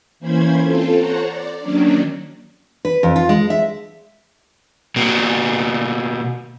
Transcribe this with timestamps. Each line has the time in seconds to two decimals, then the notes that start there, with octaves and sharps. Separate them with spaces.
0.20 E3 A#3 C#4 C5 B5 G#6
0.62 C4 F4 A4
0.97 A4 C5 C#5 F#5 A#5
1.27 D5
1.60 D#3 F#3 A#3 C#4 D4
2.85 B4
3.03 F2
3.16 F4
3.29 G#3
3.50 E5
4.96 B2 A#3 F#4